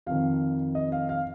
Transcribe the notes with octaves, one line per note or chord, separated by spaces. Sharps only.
F2 D#3 F5
D#5
F5
F5